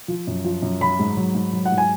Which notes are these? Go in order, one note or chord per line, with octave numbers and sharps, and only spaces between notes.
F3
F#2
F3
F#2
F#3 B5
G#2
F#3
G#2
F#3
F#5
G#2
G#5